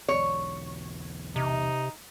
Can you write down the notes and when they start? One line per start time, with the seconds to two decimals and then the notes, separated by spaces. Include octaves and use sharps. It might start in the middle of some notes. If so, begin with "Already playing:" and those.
0.08 B1 E2 C#5
1.36 C3 D#4